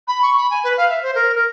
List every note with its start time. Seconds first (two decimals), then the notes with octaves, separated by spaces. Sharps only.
0.08 B5
0.22 C#6
0.37 B5
0.50 G#5
0.64 B4
0.77 F5
0.89 E5
1.02 C5
1.15 A#4
1.35 A#4